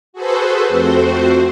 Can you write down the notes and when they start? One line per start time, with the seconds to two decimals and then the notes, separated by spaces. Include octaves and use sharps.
0.13 F#4 G#4 A4 B4 C5
0.68 F2 A3 C4 F#4 C5